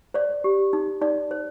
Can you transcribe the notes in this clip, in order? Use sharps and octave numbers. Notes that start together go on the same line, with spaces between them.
C5 D5
G4
D#4
D#4 D5
C5